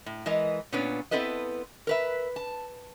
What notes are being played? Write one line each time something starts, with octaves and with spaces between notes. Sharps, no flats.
A2
E3 G#3 A#4 B4 D#5
A#2 B3 C#4 D4 B4 C#5
B3 C4 E4 A4 B4 D#5
A#4 B4 E5
A5